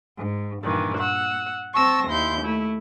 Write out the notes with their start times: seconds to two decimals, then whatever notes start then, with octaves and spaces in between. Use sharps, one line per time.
0.16 G#2
0.62 G2 A#2 D#3 E3
0.98 F#5 E6
1.75 C4 A5 C#6 E6 A#6
2.08 D#2 E4 C6 G6
2.41 A3 E4